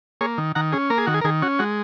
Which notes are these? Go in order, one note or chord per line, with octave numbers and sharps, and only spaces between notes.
A#3 G#4 C#5
D#3
D#3 F#5 A#5
C#4 G#4
A#3 A#4
G#4
D#3 F#4
G#4
A#4
D#3 G#4
C#4 F#4
G#3 F#4